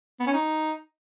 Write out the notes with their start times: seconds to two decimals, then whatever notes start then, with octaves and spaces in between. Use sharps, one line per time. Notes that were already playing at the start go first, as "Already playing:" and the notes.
0.20 B3
0.27 C#4
0.34 D#4